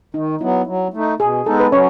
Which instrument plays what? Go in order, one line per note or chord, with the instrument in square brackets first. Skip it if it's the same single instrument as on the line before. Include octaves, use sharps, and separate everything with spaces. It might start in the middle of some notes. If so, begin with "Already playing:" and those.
[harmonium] D#3 [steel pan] D#4
[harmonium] F#3 B3 [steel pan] E4
[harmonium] F#3
A3 D#4
[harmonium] B2 [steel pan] G#4
[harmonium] G#3 B3 D#4 [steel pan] A4
[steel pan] B4
[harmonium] F#3 [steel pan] C#4 C#5